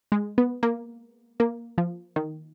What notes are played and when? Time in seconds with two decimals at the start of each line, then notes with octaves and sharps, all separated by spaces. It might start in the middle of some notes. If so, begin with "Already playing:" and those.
0.12 G#3
0.38 B3
0.63 A#3
1.40 A#3
1.78 F3
2.16 D#3